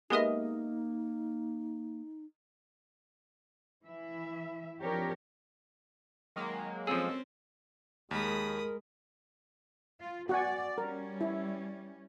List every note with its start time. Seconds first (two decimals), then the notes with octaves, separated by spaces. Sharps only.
0.10 G#3 A#3 B3 D#4 G4 A#4 D#5 E5
3.83 E3 E4 E5
4.81 F3 C4 D4 G4 A#4 C#5
6.36 D#3 F#3 G#3 A#3
6.87 F3 C4 C#4 G#4 A4
8.11 D#2 G#3 A#4 B5 D#6
10.00 F4
10.29 F#4 D5 F#5 G#5
10.78 G3 C#4 A#4
11.21 E4